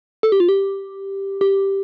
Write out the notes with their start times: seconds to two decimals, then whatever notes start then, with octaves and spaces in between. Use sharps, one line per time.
0.23 A4
0.32 G4
0.40 F4
0.49 G4
1.41 G4